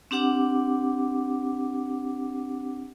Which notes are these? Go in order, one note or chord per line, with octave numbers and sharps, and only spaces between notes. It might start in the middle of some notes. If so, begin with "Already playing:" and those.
C4 D4 G4 F#5 D6